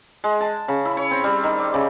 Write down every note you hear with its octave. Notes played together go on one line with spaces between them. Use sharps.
G#3
A5
C#3
E4
C#5
C4
G3
D#3
D6
C#3